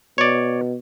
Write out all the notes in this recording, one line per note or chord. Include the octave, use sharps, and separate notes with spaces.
B2 C#5 D5